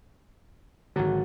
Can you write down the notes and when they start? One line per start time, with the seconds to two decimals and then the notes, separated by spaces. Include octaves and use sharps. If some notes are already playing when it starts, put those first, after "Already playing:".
0.96 G#1 D3 F#3